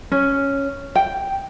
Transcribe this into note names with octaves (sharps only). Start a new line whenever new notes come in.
C#4
G5